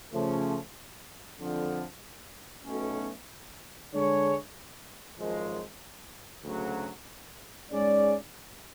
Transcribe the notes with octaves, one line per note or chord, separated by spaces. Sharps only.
C#3 F3 A3 C#4
F2 D3 F3
B1 B2 A3 C#4
D3 G#3 D4 G#4 C#5
G#1 F#2 F3 G#3
D2 C#3 F#3
G#2 G#3 C#4 G#4 D5